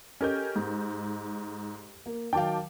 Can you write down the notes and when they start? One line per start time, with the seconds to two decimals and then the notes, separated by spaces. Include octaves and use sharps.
0.21 C#4 G4 A4 A#4 D#5 G6
0.56 G#2
2.06 A#3
2.33 D#3 F#3 F5 G5 A5 D6